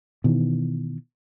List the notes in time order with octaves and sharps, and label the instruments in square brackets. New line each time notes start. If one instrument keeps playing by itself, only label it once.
[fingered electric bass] B2 D#3 E3